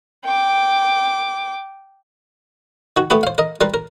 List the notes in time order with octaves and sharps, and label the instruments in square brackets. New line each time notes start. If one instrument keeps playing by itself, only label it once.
[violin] G5 D6
[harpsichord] D#3 F#4
A3 B3 G4 B4 B5
C5 F5
A#4 D#5
G3 A#4 B4 C6
A#4